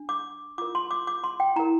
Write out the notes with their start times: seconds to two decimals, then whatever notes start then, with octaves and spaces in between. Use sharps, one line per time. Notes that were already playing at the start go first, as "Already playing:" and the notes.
Already playing: D4
0.09 D6
0.58 F4 A#4 D6
0.75 C6
0.91 D6
1.07 D6
1.24 C6
1.40 G5
1.56 E4 A#5
1.59 A#4